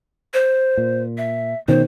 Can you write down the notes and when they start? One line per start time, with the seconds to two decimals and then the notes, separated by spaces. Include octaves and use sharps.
0.34 C5
0.77 A#2
1.18 E5
1.68 B2 D#3 C#4 C5